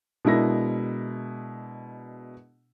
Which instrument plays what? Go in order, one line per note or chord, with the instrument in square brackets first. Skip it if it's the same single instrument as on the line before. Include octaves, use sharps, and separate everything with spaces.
[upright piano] B2 G#3 D4 E4 A#4 A#6